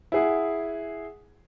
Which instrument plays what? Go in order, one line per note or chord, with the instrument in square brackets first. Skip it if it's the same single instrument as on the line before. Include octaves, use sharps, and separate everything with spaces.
[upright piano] E4 G#4 F#5